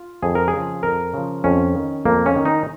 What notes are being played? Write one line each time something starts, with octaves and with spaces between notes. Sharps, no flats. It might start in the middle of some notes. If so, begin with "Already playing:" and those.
Already playing: F4
F2 G#4
A#4
G#4
C#3 F3
F2 A#4
C#3 F3
F2 C#4
D#3
F2 A#3
C#4
D#3
D#4